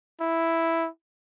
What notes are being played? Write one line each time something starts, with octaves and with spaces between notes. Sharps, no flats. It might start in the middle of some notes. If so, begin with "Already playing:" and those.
E4